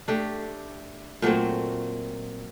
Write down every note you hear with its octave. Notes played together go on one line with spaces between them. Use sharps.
A3 D4 G4
A#2 F#3 A3 C4